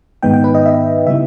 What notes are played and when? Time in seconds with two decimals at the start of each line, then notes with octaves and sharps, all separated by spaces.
0.23 G#2 D#3 G#3 B3 D#4 G5
0.33 G5
0.44 B4
0.54 D#5
0.65 E5
1.07 C#3 G3 B3 E4 E5